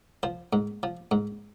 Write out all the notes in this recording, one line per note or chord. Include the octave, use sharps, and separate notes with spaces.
F3 C5
G#2
F3
G#2